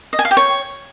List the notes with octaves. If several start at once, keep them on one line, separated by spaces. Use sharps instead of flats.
D#5
G#5
F5
G4
C#5